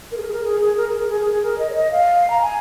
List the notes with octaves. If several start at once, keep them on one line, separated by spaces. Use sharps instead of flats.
A#4
G#4
A#4
G#4
A#4
G#4
G#4
A#4
G#4
A#4
G#4
G#4
G#4
A#4
D#5
C#5
D#5
F5
A#5
G#5